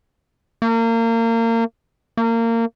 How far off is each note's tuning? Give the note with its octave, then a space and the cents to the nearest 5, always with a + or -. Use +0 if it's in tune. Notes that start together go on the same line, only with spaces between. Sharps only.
A#3 -30
A#3 -25